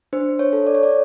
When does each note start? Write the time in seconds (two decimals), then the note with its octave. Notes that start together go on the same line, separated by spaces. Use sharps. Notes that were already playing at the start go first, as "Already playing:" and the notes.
0.13 D4 C5
0.39 C#5
0.53 A4
0.67 D5
0.75 C#5
0.83 D5